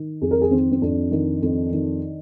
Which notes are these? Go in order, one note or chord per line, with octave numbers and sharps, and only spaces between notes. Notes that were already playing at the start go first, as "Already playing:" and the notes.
Already playing: D#3
F2 G#4
A#4
G#4
D#3 C4
C4
F2 D4
D#3
F2
D#3